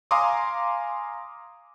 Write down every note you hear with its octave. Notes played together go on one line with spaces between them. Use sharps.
F5 G#5 A#5 C6 D6 D#6